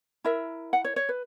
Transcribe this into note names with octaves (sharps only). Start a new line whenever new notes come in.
E4 A#4 E5
F#5
C#5
C#5
B4